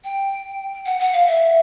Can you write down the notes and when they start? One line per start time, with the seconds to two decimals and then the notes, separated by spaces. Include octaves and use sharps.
0.04 G5
0.86 F#5
0.99 F#5
1.13 F5
1.27 E5